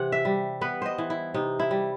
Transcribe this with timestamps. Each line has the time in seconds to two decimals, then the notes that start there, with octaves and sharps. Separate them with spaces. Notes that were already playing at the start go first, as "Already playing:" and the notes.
Already playing: C3 E3 F#5
0.12 E5
0.25 G3
0.61 B3 B4
0.82 C5 D#5
0.98 E3
1.10 E4
1.34 C3 D#4
1.59 E4
1.71 G3